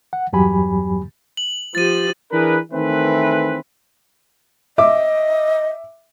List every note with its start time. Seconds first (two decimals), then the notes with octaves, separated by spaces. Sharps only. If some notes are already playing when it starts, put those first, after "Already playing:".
0.13 F#5
0.33 E2 G2 F#3 G4 G#5 B5
1.37 F#7
1.75 F3 G4 A6 D#7
2.32 E3 D4 G#4 A#4 B4
2.73 D#3 E3 A3 C4 B4
4.78 D#5 E5 D6